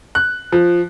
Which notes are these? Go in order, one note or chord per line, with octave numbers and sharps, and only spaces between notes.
F#6
F3